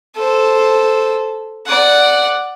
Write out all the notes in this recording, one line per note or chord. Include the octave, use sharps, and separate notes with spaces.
A4 C5
D5 F#5